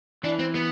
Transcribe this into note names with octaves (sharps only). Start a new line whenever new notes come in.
E3 D4
C4
B3